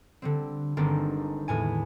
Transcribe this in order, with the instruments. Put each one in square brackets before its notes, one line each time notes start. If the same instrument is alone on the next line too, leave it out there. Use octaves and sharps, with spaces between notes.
[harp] D3 G3 C4
G1 D#3 G#3 C4 D4 G4
E2 A2 G#5